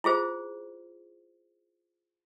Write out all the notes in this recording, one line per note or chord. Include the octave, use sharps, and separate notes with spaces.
E4 F4 G#4 C5